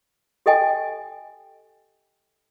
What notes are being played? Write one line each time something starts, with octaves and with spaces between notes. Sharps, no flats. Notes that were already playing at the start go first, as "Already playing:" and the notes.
G4 A4 D#5 G5 G#5